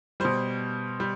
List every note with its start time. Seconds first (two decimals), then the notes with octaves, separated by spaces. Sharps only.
0.20 B2 G3 C5
1.00 G3